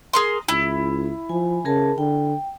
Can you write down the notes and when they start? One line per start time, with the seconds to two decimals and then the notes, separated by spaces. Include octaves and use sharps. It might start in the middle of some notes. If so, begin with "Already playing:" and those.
0.13 G#4 A#4 C6
0.48 C#2 E4
1.29 F3 G#5
1.65 C#3 G#4 A#4 A5
1.98 D3 G5